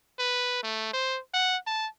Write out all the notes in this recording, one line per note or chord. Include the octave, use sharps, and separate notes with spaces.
B4
A3
C5
F#5
A5